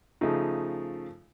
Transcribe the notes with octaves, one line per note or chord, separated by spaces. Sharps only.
C#3 F3 A3 D#4